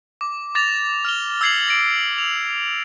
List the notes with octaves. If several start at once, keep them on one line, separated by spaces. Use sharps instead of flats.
D6
D6 A6 A#6 F7
F6 F7 G7
E6 F6 G#6 C7 C#7 F#7
A#6 D7
F7